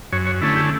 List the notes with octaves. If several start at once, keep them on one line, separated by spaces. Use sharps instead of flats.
F#2 C#5
C#5
D3 A3 C#4 E4
G4